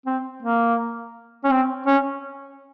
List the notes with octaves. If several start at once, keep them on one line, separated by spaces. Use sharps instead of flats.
C4
A#3
C#4
C4
C#4